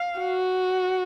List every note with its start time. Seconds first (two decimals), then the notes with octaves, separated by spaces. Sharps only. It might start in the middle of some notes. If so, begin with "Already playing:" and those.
Already playing: F5
0.20 F#4